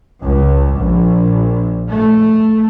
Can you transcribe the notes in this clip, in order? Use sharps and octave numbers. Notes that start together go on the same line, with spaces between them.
C#2
A#1
A3